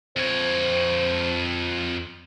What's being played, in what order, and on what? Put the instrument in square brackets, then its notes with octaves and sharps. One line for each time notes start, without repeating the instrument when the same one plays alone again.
[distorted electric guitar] F2 C#5 [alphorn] C5